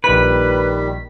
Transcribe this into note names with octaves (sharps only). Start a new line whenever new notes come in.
A#1 D#3 G3 B4 B6